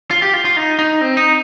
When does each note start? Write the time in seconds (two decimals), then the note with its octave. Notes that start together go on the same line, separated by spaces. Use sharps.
0.11 F4
0.22 G4
0.34 F4
0.45 F4
0.57 D#4
0.79 D#4
1.01 C4
1.17 D#4